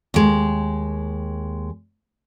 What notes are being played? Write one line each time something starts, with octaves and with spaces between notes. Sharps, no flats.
D#2 G#3